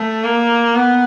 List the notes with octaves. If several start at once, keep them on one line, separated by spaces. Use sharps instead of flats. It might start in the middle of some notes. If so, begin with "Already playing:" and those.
Already playing: A3
A#3
B3